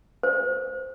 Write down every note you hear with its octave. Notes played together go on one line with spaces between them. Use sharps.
C5